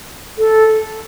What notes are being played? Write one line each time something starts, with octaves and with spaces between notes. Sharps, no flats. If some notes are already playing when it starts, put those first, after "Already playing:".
A4